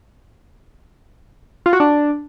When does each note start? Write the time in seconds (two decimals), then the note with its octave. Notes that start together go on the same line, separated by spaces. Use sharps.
1.66 F4
1.73 F#4
1.80 D4